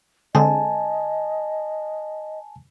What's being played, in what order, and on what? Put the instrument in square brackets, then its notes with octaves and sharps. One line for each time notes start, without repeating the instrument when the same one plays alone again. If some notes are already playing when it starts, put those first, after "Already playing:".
[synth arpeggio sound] D3 G#3 C4 [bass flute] D#5 [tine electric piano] G#5 A5